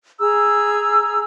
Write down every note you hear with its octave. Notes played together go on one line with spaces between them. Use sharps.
G#4 A#5 E6